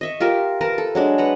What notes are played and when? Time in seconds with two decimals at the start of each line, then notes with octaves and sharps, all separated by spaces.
0.01 D#5 E5 C#6
0.20 F4 G4 A#4 E5
0.61 A#4 B4 A5 A#5
0.78 A4
0.95 F#3 G#3 D4
1.18 B4 F#5 A#5